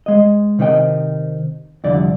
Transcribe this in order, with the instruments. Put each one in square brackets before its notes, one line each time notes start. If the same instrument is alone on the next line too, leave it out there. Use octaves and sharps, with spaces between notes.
[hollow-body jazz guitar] G#3 D#5
C3 D#3 C4 D#5 G5
C2 F2 D3 D5